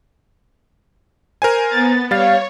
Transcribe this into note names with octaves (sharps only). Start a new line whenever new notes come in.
A#4 C5 G#5
B3 A6
G3 C#5 F5 A6